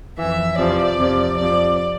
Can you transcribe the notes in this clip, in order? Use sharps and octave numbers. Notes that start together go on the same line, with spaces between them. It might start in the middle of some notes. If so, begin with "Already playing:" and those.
F2 E3 E5
E2 C3 F3 D5
F2 C3 F3
F2 C3 F3 D5